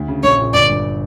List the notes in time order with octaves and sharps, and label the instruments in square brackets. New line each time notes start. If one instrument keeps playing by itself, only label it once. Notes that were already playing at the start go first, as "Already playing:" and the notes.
Already playing: [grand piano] D2
C#3
[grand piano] A#1 [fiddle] C#5
[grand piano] A#2
[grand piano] G1 [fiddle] D5
[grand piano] G2